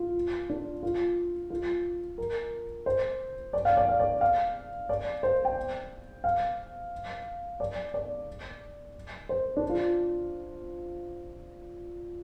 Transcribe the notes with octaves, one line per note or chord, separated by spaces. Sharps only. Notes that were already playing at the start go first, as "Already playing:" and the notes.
Already playing: F4
D4
F4
F4
A#4
C5
D5
F5
D5
F5
D5
F5
D5
C5
G5
F5
D5
D5
C5
D4
F4